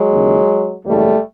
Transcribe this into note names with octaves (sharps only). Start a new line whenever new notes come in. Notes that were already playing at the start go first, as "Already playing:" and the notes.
Already playing: F#3 G#3
D#2 C#3 E3
F#1 E2 B2 F#3 G3 A3